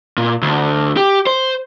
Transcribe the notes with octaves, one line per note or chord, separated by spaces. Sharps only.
A#2
D2
G4
C5